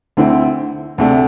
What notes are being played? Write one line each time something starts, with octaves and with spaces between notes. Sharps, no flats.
D2 D3 C4 E4
D2 C3 A3 D4